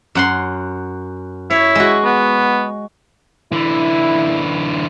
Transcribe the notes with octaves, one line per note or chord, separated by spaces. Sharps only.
F#2 F#5 C6
E4 C#5
G#3 F#4
B3
D3 E3 E4